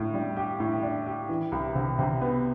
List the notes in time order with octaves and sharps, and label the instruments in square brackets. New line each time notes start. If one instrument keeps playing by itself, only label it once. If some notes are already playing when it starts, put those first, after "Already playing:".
Already playing: [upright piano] A2
G3
G4
A2
D4
G4
E3
C2
C3
C3
B3